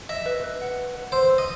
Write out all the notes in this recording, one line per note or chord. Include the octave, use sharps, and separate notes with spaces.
D#5 E5
B4
B4
F#5
B4
B4
C5 E6
E6
D#5